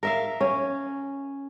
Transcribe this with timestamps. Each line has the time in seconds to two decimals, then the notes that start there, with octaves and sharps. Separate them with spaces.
0.03 A#4 E5 F5
0.41 C#4